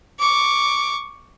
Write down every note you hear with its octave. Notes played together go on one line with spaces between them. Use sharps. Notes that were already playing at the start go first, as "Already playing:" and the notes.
C#6 D6